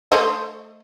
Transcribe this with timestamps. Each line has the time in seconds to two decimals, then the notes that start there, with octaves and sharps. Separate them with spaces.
0.12 A3 C5 D#5